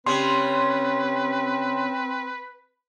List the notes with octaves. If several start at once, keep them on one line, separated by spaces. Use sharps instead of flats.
C#3 G3 C4 B4 C6